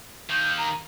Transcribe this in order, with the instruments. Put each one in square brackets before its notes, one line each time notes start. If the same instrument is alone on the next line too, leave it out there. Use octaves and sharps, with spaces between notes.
[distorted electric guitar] D#3 A#3 [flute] G6
[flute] A#5